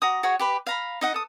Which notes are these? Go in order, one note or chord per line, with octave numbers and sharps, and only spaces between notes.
F#4 A#5 D#6
F#4 G#4 C#5 F#5
G4 B4 B5
F5 A#5 B5
D#4 D#5 F#5
A4 D#6